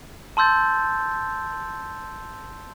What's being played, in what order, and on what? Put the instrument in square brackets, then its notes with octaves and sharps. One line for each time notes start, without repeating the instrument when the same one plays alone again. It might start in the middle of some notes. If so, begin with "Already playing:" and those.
[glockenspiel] A5 C6 E6 G6 A6